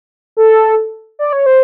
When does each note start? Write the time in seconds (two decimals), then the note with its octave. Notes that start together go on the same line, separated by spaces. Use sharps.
0.37 A4
1.19 D5
1.33 C#5
1.46 C5